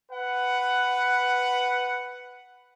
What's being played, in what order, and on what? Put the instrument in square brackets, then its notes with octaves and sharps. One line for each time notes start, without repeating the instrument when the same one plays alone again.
[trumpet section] B4 F#5